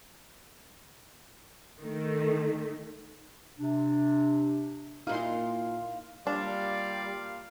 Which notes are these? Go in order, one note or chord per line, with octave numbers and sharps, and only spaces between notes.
D#3 A3
C3 D4
A#2 A#3 D#4 E4 F5 C6
G3 A#3 D4 F4 D5 F5